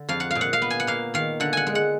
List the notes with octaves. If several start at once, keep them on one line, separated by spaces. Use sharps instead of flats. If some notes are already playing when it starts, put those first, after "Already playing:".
Already playing: D3
F2 F5
F#5
A#2 F5
F#5
F5
B3
G#5
F#5
A#3 F5
D#3 F5
D3 F#5
F#5 G#5
G#3
F#5